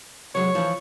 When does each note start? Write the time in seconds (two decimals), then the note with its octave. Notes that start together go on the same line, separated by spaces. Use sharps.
0.35 C2 F#3 G#3 C#5
0.55 E3 F3